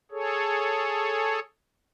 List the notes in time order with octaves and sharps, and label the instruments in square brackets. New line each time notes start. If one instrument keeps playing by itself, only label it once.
[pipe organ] G#4 A4 C#5